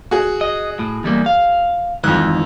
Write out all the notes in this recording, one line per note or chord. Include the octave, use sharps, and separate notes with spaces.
F#4 G#4
D#5
A2
E2 G3 A#3
F5
F2 G#2 D#3 E3 F#6